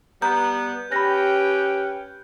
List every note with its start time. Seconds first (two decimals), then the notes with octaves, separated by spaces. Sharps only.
0.22 G3 B3 A#5 G6
0.92 C#4 G4 B4 G5 B5 A#6